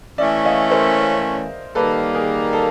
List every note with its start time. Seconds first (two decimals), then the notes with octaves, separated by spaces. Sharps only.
0.18 E3 A3 C#4 D5 E5
0.45 D#5 F5
0.70 A#4 C5
1.75 D#3 G3 A#3 A4 B4
2.15 G#4 A#4
2.53 A4